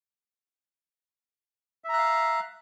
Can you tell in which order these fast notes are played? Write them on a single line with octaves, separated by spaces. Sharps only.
E5 A#5 F#6 F5